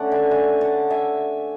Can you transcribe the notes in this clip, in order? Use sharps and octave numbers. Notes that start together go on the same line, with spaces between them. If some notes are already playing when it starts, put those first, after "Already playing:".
Already playing: D3 A3 C#4 D5 F#5
E5 G#5
E5 G#5
F#5 A5
E5 G#5